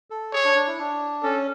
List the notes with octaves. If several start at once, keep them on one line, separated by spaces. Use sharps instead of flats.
A4
G#4 C#5
D4
D4
E4
D4
C#4 A4